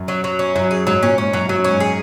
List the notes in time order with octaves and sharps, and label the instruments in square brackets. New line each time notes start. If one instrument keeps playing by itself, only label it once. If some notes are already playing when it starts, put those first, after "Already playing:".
Already playing: [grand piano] F#2
[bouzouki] F#3
F#3
C#4
[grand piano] F#2 [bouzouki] F#3
[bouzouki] G#4
[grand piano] G#2 [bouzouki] F#3
[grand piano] A#2 [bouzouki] C#4
[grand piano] G#2 [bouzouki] C#4
[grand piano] F#2 [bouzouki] F#3
[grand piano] F#2 [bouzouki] F#3
[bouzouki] C#4
[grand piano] G#2
[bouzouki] G#4